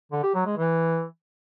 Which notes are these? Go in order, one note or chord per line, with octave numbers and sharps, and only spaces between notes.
D3
G4
F#3
G#3
E3